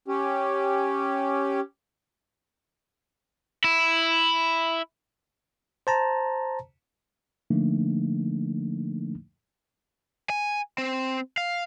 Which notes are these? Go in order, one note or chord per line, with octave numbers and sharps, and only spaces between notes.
C#4 G4
E4
C5 A5 A#5
D3 F3 A3 A#3 D4 D#4
G#5
C4
F5